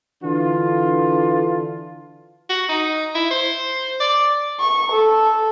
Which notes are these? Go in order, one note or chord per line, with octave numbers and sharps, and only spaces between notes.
D3 E3 D4 F4
F#4
D#4
E4
C5
D5
C#6
A4